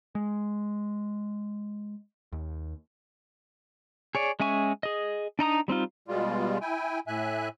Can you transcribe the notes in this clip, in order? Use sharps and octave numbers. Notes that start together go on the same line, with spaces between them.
G#3
D#2
G#4 C#5 D5
G#3 C#4 E5 G#5 C#6
G#4 D#5
D4 D#4 A#5 D#6
G3 C4 D#4 F4
B2 G3 G#3 F4
E4 G5 G#5
A2 E5 G#5 F#6